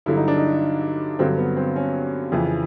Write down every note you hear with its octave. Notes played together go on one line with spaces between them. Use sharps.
G2 D3 F#3 E4
D#4
D4
D#4
G2 D3 F#3 C4
B3
C4
C#4
F2 C#3 E3